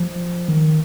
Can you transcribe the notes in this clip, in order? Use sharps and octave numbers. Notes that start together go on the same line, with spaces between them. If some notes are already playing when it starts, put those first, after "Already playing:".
Already playing: F3
D#3